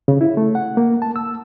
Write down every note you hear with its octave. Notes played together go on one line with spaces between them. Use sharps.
C#3
E4
A3
F#5
A#3
A5
E6